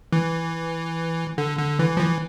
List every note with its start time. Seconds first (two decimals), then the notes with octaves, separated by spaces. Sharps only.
0.13 E3
1.38 D3
1.59 D3
1.79 E3
1.97 F3
2.00 E3